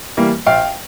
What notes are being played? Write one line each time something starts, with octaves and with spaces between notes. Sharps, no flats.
E3 G3 A#3
A#1 F5 G5